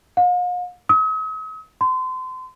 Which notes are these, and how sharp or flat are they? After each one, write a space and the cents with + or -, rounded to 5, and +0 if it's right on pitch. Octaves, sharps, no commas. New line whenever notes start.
F5 +45
D#6 +45
C6 -30